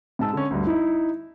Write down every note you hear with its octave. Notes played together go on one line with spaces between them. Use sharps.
G#2 G#3 A5 E6
D3 C#4
D2 G2
D#4 E4